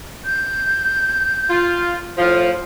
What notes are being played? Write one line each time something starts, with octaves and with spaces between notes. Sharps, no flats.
G6
F4
A2 F3 F4